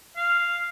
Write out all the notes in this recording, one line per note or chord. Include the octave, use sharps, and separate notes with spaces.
F5